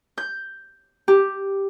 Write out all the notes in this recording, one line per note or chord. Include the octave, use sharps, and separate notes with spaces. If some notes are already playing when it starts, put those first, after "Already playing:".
G6
G4